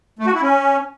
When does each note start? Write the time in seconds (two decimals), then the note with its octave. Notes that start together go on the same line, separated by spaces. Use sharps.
0.19 A3
0.27 F#4
0.34 E4
0.42 C#4